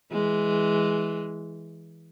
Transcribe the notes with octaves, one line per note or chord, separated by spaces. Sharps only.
E3 G#3